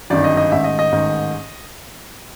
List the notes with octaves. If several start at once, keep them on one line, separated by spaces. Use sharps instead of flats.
G1 F#2 D#3 D5
D#5
D#5
A1 G#2 D#3 E5
D#5
D#5
A1 G#2 D#3